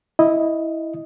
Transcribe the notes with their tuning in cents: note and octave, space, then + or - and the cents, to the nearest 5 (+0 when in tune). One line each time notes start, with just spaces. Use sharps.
E4 -10 D#5 +0